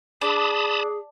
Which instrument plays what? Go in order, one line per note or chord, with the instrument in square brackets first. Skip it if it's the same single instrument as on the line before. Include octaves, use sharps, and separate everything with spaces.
[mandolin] D4 [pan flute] G#4 [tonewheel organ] A5 B5 D#6